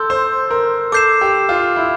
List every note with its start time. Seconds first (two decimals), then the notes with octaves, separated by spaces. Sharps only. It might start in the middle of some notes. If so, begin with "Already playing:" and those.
Already playing: A4 C6 E6 G6
0.10 C5
0.51 A#4
0.92 A4 D6 G6 C7 E7
1.21 G4
1.49 F4
1.76 E4